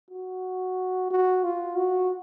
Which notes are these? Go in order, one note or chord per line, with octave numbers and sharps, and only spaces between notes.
F#4
F#4
F4
F#4